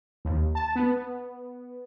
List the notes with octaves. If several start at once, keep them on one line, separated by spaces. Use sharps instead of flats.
D#2
A5
B3